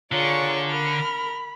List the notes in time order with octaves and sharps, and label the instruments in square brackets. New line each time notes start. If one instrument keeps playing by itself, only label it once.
[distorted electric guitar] D3 [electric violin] F4 G#4 [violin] A#4 C#5 [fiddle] D5 C#6
[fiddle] A#4 [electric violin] B5 [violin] F6